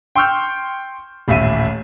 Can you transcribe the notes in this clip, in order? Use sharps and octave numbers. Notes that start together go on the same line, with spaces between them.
G5 C6 C#6 E6 F6 G6
D#1 A1 A2 E5 D#7